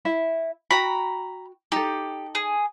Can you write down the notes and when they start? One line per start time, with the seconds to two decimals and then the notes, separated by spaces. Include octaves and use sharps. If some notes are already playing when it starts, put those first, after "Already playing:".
0.05 E4 E5 B5
0.71 F#4 G5 A#5 B5
1.72 D#4 G4 A4
2.35 G#4